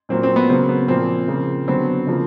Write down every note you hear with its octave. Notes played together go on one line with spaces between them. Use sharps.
A#2 F#3 A#3 C4
C4
B3
C#3 F#3 A#3 C4
B3
A#2 F3 A#3 C4
C#3 F3 A#3
D3 F#3 B3 C4
C#3 F3 A#3